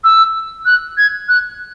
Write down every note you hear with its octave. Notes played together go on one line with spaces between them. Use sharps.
E6
F#6
G#6
F#6